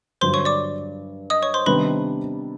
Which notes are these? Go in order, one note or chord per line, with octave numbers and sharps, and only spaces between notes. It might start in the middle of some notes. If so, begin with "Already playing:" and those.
G2 D3 F#3 C5 C6
C#5 C#6
D5 D6
D#5 D#6
C#5 C#6
C5 C6
C3 D#3 G3 B3 D4 B4 B5